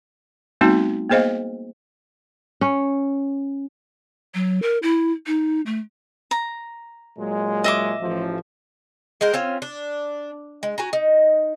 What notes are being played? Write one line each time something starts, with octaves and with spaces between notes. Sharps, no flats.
G3 A3 B3 C4 D#4 F#4
A#3 B3 G#4 C5 D#5 F5
C#4
F#3
A#4
E4
D#4
A3
A#5
A#2 F#3 G#3
D#5 E5 D6
A1 F3
G#3 A#4 C5 F#5
C4 C#4 F4
D4
G#3
F#4 G#5 A#5
D#4